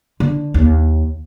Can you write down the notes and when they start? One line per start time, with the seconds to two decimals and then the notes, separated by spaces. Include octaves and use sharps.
0.20 D3
0.54 D#2